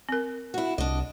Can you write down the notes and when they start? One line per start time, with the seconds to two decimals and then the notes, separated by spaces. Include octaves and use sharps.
0.09 C4 A#4
0.54 E4 F#4
0.78 C2 D4 D#5